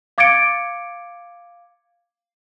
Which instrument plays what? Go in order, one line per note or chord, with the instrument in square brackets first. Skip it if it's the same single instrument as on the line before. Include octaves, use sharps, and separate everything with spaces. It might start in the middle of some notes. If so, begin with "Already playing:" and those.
[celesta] F5 D6 G#6 A6 C#7 D7